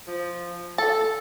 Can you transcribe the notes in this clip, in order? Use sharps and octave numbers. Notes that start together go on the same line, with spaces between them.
F3
A4 A5